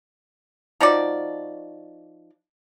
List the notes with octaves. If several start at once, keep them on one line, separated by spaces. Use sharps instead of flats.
F3 D#4 F#4 D5